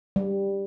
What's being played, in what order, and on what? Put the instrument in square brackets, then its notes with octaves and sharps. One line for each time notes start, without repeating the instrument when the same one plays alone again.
[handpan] G3